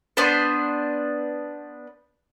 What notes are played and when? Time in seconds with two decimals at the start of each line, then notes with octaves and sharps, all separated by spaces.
0.17 B3 D4 B4 C5